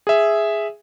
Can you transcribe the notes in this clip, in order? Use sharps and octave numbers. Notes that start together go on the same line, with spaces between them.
G#4 E5